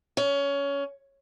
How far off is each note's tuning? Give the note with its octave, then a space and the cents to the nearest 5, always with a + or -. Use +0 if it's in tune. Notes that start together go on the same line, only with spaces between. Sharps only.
C#4 +20